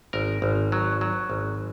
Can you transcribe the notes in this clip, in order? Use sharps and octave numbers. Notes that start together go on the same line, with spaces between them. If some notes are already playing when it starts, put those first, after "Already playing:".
G#1 A#4
G#1
F#3
F#3
G#1